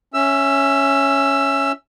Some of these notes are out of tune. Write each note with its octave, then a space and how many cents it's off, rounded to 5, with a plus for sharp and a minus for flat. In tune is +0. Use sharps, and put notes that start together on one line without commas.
C#4 +0 E5 +0 E6 +20